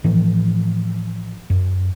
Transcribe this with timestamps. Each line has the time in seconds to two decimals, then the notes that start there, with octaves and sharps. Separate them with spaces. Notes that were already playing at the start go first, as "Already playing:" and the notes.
0.04 A2 E3 F3
1.50 F#2